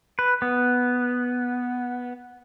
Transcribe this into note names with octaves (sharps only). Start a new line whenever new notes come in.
B4
B3